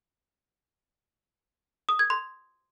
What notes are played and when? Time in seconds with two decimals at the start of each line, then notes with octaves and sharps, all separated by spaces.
1.89 D#6
1.99 G#6
2.10 C6